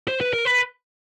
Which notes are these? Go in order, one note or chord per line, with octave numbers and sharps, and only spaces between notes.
C5
B4
A#4
B4